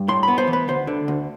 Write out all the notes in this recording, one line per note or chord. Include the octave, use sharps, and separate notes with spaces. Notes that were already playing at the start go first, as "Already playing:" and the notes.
Already playing: G2
A2 C6
B3 B5
C5
E3
B4
D2 C5
D3
D2